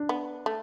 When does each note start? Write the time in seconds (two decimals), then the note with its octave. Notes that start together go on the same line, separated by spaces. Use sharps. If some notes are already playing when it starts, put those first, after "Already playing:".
Already playing: D4
0.09 B3
0.46 A3